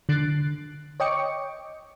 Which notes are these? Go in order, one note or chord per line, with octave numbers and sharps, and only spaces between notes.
D3 F#6 A6 C7 D7
C#5 D#5 G5 C#6 D6 C#7